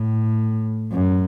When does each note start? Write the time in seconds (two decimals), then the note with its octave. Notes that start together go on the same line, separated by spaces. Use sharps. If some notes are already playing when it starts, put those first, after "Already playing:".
Already playing: A2
0.92 F#2